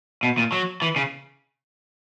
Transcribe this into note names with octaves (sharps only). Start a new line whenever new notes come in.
B2
A#2
F#3
E3
C#3